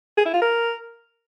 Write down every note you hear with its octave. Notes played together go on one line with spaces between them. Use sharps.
G#4
E4
F4
A#4